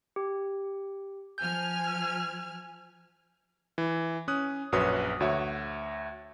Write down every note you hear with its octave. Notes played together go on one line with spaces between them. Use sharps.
G4
F3 G#5 F6 G6
E3
C#4 D#6 F#6
A#1 F#2 F#4 B4 C#5 D#6
D2 F#4 C#5 E5